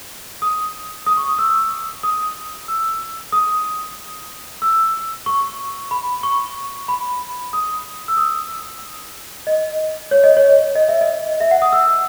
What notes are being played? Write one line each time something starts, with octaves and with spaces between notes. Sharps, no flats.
D#6
D#6
C#6
D#6
E6
D#6
E6
D#6
E6
C#6
B5
C#6
B5
D#6
E6
D#6
D#5
C#5
D#5
C#5
D#5
E5
D#5
E5
F#5
D#6
E6